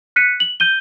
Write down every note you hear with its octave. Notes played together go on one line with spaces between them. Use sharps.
F#6 B6 C#7 D#7
F#7
G6 D#7 G7